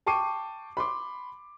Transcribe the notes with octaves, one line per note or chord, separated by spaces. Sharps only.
G5 A5 C#6 D6 C7 D#7
B5 C6 D6